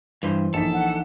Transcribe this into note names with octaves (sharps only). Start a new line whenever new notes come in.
G2 E3 B4 C5
A#1 D#4 A4 B6
F#5